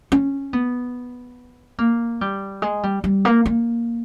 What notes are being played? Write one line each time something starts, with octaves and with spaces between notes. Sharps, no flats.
C#4
B3
A#3
G3
G#3
G3
G3
A#3
A#3